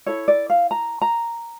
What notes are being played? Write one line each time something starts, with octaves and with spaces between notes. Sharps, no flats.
E4 A4 C#5
D5
F5
A#5
A#5